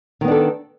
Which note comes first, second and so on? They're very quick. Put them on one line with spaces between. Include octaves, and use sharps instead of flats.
D#3 B3 D4 A4